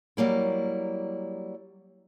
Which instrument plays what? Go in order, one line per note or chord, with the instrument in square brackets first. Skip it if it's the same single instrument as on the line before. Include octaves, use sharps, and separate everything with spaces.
[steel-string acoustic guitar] F#3 G3 A#3 E4